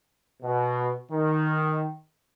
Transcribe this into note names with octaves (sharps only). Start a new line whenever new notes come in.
B2
D#3